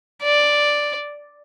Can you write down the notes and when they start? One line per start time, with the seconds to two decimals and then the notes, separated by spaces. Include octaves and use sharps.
0.23 D5